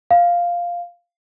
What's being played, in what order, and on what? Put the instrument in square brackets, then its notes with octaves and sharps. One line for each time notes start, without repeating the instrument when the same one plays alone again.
[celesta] F5